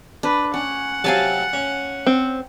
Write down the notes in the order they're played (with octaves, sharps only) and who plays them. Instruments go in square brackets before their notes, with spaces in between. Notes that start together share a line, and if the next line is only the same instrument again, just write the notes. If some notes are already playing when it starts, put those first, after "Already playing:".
[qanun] D4 [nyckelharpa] B4
[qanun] C#4 [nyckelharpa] F#5
[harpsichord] C3 F#3 C4 [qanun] F5 G#5 A5
[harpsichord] C#4
[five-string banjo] C4